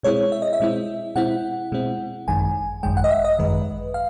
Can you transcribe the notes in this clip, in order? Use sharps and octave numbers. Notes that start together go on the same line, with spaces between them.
B2 G#3 C4 E4 C#5
E5
D#5
E5
B2 G#3 C4 E4
B2 G#3 C4 E4 F#5
B2 G#3 C4 E4
G#1 F#2 D#3 G#3 G#5
G#1 F#2 D#3 G#3 G5
F#5
D#5
E5
D#5
G#1 F#2 D#3 G#3 B4
F5